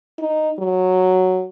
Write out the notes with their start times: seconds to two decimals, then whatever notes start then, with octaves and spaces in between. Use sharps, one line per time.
0.18 D#4
0.59 F#3